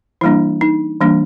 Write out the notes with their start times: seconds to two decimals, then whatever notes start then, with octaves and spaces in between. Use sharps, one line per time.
0.21 E3 G3 A#3 D4 E4
0.61 D#4
1.01 E3 G3 A#3 D4